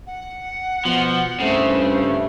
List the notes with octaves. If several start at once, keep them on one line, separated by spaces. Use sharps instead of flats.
F#5
B2 F3
C2 G2 C#3 A3 C5